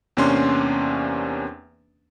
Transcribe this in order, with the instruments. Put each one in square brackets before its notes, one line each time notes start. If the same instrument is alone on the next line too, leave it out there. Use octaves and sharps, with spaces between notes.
[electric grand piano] E2 C3 A#3 C#4 D4 C6